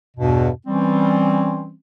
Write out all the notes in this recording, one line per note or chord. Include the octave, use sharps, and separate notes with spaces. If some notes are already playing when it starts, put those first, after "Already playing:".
E2 G2 B2
E3 G3 C4 C#4